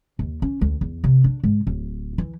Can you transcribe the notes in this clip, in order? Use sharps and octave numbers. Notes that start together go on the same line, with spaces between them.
D#2
C#4
D2
E2
C3
D4
G#2
D1
E3